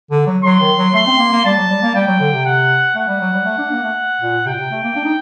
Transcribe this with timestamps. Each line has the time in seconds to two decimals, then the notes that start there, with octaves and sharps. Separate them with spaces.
0.11 D3
0.27 F#3
0.44 F#3 C6
0.61 D#3
0.77 F#3
0.94 A3 C6
1.07 C4
1.19 A#3
1.32 A#3
1.45 G3 A5
1.58 F#3
1.70 G3
1.82 A#3
1.95 G3 G5
2.07 F#3
2.20 D3
2.33 C3
2.45 F#5
2.95 A3 F#5
3.08 G3
3.21 F#3
3.33 G3
3.45 A3
3.59 D4
3.72 A#3
3.83 A3
4.21 A#2
4.46 C3 G5
4.54 A#2
4.59 C3
4.71 A3
4.84 A#3
4.96 D4
5.05 D#4